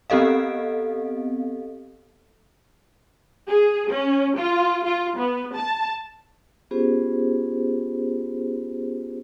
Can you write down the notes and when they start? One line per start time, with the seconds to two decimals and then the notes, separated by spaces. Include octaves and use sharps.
0.10 B3 C4 G4 A4 D#5 F5
3.47 G#4
3.91 C#4
4.36 F4
4.84 F4
5.17 B3
5.55 A5
6.71 B3 C#4 F4 G4 G#4 C5